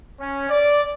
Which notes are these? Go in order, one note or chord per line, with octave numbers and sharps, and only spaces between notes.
C#4
D5